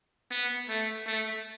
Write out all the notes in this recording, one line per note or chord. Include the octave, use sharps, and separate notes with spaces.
B3
A3
A3